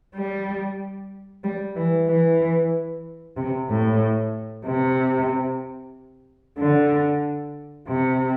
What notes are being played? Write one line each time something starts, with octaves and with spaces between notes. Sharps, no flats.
G3
G3
E3
E3
C3
A2
C3
D3
C3